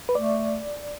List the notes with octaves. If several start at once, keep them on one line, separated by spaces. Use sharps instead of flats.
B4
A3 D5